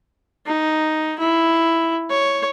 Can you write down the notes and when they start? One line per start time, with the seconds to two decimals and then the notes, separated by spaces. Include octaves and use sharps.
0.46 D#4
1.19 E4
2.10 C#5